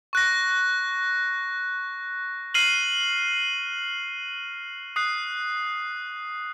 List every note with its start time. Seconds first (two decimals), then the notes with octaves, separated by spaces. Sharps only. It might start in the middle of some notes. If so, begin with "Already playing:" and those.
0.13 C#6 F#6 A#6
2.54 F6 C7 D#7 F#7
4.96 D#6 F#6 C7